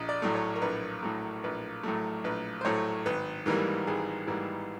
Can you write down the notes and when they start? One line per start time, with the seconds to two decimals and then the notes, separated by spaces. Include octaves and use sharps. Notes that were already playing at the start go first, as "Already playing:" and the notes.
Already playing: A#1 D#5
0.09 D5
0.22 A2 F#3 A3
0.35 C#5
0.55 A#4
0.62 A#1 B4
1.03 A2 F#3 A3
1.44 A#1 B4
1.83 A2 F#3 A3
2.24 A#1 B4
2.61 C5
2.65 A2 F#3 A3 C#5
3.06 G#1 B4
3.46 G#2 E3 G3 A#3 A#4
3.87 G#1 G#4
4.27 G#2 E3 G3 A#3